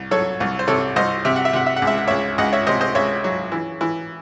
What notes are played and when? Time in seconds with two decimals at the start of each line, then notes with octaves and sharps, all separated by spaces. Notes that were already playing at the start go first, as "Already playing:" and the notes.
Already playing: C2
0.11 F#3 A4 C#5
0.40 C2
0.59 C5
0.68 C3 A4 C#5
0.96 C2 C5 D#5
1.25 C3 E5
1.36 F#5
1.45 E5
1.53 C3 F#5
1.66 E5
1.76 F#5
1.82 C#2
1.87 E5
1.98 F#5
2.07 C#2 C#5 E5
2.38 C#2 D#5 F#5
2.53 C#5 E5
2.67 C3 C5 D#5
2.81 C5 D#5
2.95 C#2 C#5 E5
3.24 F#3
3.52 E3
3.81 E3